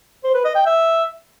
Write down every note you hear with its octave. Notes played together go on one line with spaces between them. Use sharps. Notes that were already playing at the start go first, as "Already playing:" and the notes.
C5
B4
D#5
G5
E5